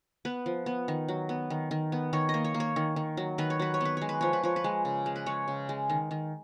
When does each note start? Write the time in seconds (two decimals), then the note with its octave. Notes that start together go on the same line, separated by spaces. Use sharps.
0.25 B3 B4
0.46 F3
0.66 B3
0.88 D#3
1.08 F#3
1.29 B3
1.50 D#3
1.71 D#3
1.92 B3
2.13 D#3 C#5
2.29 D#5
2.34 A#3
2.44 C#5
2.54 A#3
2.60 C#5
2.76 D#3
2.96 D#3
3.17 F#3
3.38 D#3 B4
3.50 C#5
3.59 F#3 B4
3.74 C#5
3.81 B3 B4
3.97 G#3 C#5
4.09 B4
4.21 F3 C#5
4.33 B4
4.44 F3 C#5
4.56 B4
4.64 G#3
4.85 C#3
5.06 G#3
5.16 B4
5.26 G#3 C#5
5.48 C#3
5.69 G#3
5.89 D#3
6.11 D#3